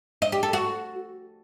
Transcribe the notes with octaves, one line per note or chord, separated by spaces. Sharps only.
D#5
G4
A4
F#4